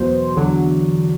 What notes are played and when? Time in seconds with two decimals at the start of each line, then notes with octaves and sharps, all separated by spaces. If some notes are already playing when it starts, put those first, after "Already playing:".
Already playing: E2 B2 F#3 C5
0.36 E2 D3 F#3